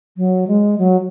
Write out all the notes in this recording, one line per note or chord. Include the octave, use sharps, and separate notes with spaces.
F#3
G#3
F#3